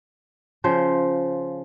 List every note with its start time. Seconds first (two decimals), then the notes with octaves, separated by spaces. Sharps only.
0.64 C#3 F3 C5